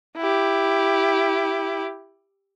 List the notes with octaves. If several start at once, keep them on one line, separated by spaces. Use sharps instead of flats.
E4 G4